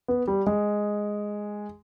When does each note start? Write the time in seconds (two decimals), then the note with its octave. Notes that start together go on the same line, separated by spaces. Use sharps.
0.08 B3
0.28 G3
0.47 G#3